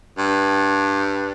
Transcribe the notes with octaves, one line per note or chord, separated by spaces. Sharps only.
G2